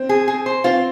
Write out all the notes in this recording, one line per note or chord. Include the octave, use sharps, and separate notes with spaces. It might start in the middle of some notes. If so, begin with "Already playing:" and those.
Already playing: C4
G#4
G#4
C5
C4 F4